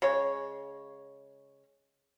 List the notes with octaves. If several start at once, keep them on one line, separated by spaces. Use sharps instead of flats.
C#3 G#3 C#5